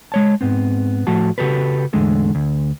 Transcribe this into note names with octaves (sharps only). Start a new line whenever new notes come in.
G#3 C#5 A5
G#2 B3 C4
A2 F3 A3 F#4 A5
C#3 F#4 G4 A4 B4
E2 A2 D3 G#3 A3
D2